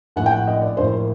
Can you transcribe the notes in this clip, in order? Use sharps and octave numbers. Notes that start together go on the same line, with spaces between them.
A#1 A2 F#5
G5
F#5
D#5
D5
A#1 A2 C5
C5
A#4